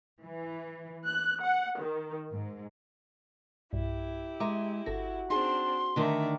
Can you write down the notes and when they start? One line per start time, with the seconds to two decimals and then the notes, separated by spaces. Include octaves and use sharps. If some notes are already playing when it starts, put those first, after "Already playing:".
0.25 E3
1.06 F#6
1.43 F#5
1.80 D#3
2.33 G#2
3.73 B1 G2 E4 G4
4.40 G#3 E5 A#5 D6
4.86 G1 F#4 A4 A#6
5.30 C4 D4 D#4 G#4 C6
5.96 D3 D#3 A3 D5 E5 A#5